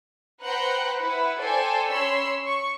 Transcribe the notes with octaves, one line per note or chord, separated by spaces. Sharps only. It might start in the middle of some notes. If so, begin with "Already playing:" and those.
B4 C5 F#5 G5 A#5 F#6
E4 B4 F#5
A4 C5 D5 G5 G#5
C#4 C#5 B5 C6 E6
C#6